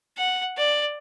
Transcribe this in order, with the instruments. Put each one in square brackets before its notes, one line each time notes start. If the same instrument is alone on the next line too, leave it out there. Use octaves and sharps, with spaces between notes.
[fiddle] F#5
D5